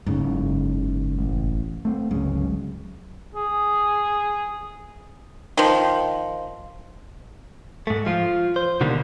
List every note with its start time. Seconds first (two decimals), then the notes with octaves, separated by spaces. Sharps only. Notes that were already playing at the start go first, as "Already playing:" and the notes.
0.06 F#1 G#2 C#3
1.19 A1
1.85 A3 C4
2.11 G1 C#2 C#3 F#3
3.35 G#4
5.57 D#3 F3
7.87 G#2 A3
8.06 F3 F4
8.56 C5
8.81 B2 D3 D#3 G3 A#3